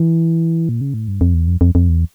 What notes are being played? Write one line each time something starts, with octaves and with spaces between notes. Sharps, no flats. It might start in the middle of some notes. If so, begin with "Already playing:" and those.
Already playing: E3
A#2
C#3
A2
G2
F2
E2
F2
F2
F2
E2